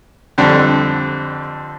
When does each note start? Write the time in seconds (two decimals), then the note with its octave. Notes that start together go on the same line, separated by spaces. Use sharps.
0.38 F2 D3 G3 C4